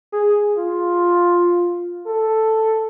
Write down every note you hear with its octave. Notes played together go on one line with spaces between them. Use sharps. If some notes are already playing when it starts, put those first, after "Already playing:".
G#4
F4
A4